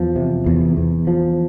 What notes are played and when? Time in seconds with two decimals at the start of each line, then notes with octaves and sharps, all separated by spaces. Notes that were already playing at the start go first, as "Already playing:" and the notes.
Already playing: E2 F3
0.16 C3
0.46 E2
0.77 E2
1.07 F3